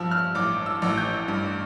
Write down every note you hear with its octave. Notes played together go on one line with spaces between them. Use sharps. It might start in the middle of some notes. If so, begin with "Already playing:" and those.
Already playing: G2 F3 E6
F6
A1 D6
E6
A1
G6
G2